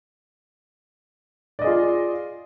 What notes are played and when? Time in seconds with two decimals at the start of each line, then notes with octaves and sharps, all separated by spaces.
1.59 D5
1.61 D#5
1.64 G#4
1.67 F4